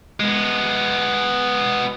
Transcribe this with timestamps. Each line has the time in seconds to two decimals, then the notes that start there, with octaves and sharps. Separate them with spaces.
0.20 G#3 B3